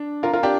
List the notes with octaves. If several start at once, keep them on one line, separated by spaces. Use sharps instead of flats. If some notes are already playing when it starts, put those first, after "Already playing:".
Already playing: D4
F4 A#4
F4 A#4
D4 G4